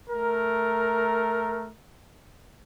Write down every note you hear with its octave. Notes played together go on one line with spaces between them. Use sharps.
A3 A#4